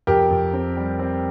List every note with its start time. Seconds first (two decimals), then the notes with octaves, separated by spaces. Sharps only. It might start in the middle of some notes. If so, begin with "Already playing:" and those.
0.07 F2 G4 A#4
0.30 F2
0.53 C4
0.77 G3
0.99 C4